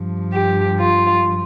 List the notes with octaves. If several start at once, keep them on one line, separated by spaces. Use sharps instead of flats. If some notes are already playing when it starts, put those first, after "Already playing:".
Already playing: G2 F3
G4
F4